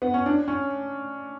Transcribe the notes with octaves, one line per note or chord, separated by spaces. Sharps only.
B3
C#4
D4
C#4